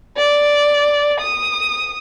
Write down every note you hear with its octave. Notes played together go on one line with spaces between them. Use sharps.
D5
D#6